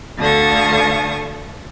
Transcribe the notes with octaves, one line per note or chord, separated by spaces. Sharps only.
D2 D3 F5 A5 C#6 D#6